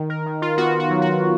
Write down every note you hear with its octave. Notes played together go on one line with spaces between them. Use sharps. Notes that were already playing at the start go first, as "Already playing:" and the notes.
Already playing: D#3
A#4
D#3
F4
B3 F#4
F#4
F#3
F#4